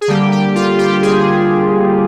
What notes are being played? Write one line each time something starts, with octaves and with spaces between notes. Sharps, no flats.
G#4
D3 G3 A#3 G4
G4
F4
G4
G#4